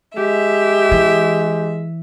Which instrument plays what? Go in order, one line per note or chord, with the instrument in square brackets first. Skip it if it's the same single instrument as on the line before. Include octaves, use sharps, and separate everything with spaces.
[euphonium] G#3 [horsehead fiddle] G4 [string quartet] E5
[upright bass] E3